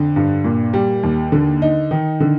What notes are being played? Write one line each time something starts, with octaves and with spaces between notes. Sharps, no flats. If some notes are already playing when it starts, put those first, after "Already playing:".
Already playing: F2 D3
G2
A#2
G3
D#2
D3
D#4
D#3
D3